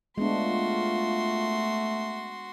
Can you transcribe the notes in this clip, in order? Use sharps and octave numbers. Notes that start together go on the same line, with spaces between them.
G#3 A3 B3 D4 F4 F#4 C6